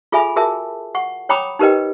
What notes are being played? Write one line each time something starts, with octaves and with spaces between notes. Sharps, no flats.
F4 G#4 A4 E5 G#5 B5
F#4 G#4 A#4 E5 A5
F#5 C#6
C#5 G5 A#5 B5 D6 D#6
D#4 G4 A#4 B4 D#5 G5